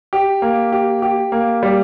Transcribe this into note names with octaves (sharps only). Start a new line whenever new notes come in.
G4
A#3
G4
G4
A#3
G3